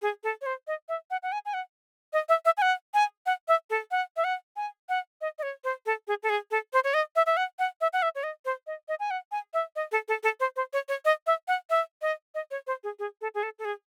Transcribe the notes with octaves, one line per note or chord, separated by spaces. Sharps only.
G#4
A4
C#5
C5
D#5
E5
F#5
F#5
G#5
G#5
F#5
D#5
E5
E5
G#5
F#5
G#5
F#5
E5
A4
F#5
E5
F#5
G#5
F#5
D#5
D#5
C#5
C5
A4
G#4
A4
G#4
A4
C5
C#5
D#5
E5
E5
F#5
F#5
E5
F#5
E5
C#5
D#5
C5
D#5
D#5
G#5
F#5
G#5
E5
D#5
A4
A4
A4
C5
C5
C#5
C#5
D#5
E5
F#5
E5
D#5
D#5
C#5
C5
G#4
G#4
A4
G#4
A4
A4
G#4